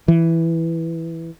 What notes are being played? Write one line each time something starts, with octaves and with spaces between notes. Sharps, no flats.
E3